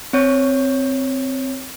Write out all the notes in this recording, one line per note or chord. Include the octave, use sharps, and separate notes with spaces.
C4 C#5